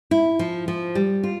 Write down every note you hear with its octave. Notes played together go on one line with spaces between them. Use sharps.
E4
F3
F3
G3
F4